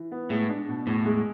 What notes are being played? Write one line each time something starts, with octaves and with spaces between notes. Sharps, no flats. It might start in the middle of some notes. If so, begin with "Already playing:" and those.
Already playing: E3
B3
A2 G#3
D4
B2
E2 A2
G#3